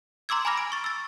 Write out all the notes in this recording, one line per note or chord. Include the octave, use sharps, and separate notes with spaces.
A#5 C6 D6 E6 G#6
G#5 A#5 B5 D6 F6 A#6
D7
C#6 A6
E6 A6